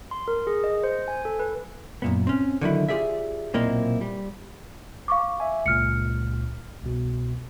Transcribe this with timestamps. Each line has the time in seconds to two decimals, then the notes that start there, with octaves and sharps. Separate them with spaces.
0.11 C6
0.28 A#4
0.47 G#4
0.64 D#5
0.84 C5
1.08 G#5
1.25 A4
1.39 B4
2.02 F#2 A#2 B3
2.27 C4 C#4
2.61 D3 D#3 F#3 E4
2.89 F4 G4 G#4 D5 E5
3.54 B1 A#2 A#3 C4 E4 D#5
4.01 G3
5.08 F5 C#6 D6
5.40 E5 G#5
5.66 C#2 A#2 F6 C#7
6.82 C2 B2